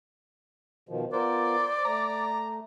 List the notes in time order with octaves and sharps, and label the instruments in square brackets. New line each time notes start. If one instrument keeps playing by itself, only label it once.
[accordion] B2 D#3 F3
[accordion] B3 F4 A#4 [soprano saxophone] C5 [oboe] D5
[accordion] A3 [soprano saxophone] A#5